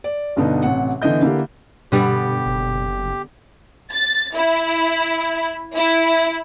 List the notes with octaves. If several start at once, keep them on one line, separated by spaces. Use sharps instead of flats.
D5
G2 B2 D3 B3 D4 D#4
A1 C3 F#5
D3 E3 B3 D#5 G6
D3 A#3 E4 G4
G2 B2 D3 G3 B3 G4
F#1
A6
E4
E4